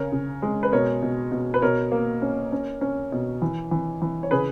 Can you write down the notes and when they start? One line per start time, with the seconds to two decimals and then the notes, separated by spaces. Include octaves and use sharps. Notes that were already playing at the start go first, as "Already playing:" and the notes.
Already playing: C#3 A#4 C#5
0.12 C#3
0.42 G#3
0.63 B4
0.72 B2 A#4 C#5
1.02 B2
1.32 B2
1.54 B4
1.62 B2 A#4 C#5
1.92 A#3
2.22 C#4
2.52 C#4
2.81 C#4
3.12 B2
3.42 E3
3.71 E3
4.02 E3
4.23 C#5
4.31 C#3 G#4 B4